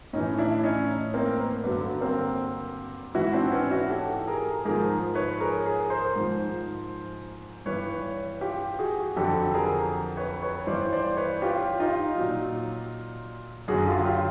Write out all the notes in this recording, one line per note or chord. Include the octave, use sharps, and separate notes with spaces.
A2 E3 C#4 D#4
D4 E4
C#4 D#4
A#3 C4
B3
G2 D3 F#3 B3
A#3 C4
G#2 E3 E4 F#4
C4 D4
B3 C#4
E4 F#4
G4 A4
G#4 A#4
G#2 F3 G#4 A#4
B4 C#5
G#4 A#4
G#4 A#4
A#4 C5
G#2 F3
G2 E3 B4 C#5
F4 G4
F#4 G#4
F2 D3 F#3 G4 A4
G#4 A#4
B4 C#5
B4 C#5
G2 E3 C5 D5
C5 D5
B4 C#5
F4 G4
D#4 F4
A#2 F#3
F#2 D3 F#3 F#4 G#4
F4 G4
F4 G4